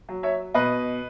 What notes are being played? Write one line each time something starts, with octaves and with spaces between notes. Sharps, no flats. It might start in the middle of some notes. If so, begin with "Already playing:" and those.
F#3
C#5 E5
B2 B4 D#5